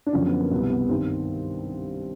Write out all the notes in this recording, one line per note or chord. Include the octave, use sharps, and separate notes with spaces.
D4
F#2 D3 F3 C#4
B3
A#3
C2 B2 B3
B3
G2 D#3 C4